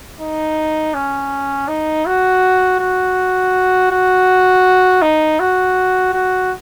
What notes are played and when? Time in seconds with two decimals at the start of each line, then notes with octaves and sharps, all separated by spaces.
0.20 D#4
0.94 C#4
1.68 D#4
2.06 F#4
2.80 F#4
3.91 F#4
5.02 D#4
5.40 F#4
6.13 F#4